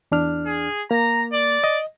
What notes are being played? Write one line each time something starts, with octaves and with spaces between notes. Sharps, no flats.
E2 D4 F6
G#4
A#3 A#5
D5
D#5